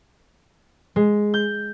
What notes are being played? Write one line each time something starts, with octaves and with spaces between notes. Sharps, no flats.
G#3
G6